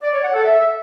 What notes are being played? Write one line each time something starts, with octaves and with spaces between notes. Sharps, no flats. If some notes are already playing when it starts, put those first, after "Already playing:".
D5
C#5
F#5
A4
E5